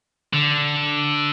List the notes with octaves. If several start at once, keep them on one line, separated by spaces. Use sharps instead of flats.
D3